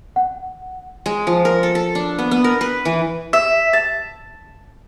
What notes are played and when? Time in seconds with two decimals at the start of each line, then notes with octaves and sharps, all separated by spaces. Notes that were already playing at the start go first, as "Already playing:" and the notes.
0.16 F#5
1.06 G#3
1.27 F3
1.45 A#4
1.63 A4
1.75 A4
1.95 D4
2.18 B3
2.31 B3
2.44 A#4
2.61 B4
2.85 E3
3.33 E5
3.73 A5